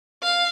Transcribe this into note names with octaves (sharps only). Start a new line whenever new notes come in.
F5